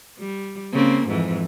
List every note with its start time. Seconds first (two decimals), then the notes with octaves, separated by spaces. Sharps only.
0.19 G3
0.73 C#3 A#3 C4
1.07 F2 G#2 E3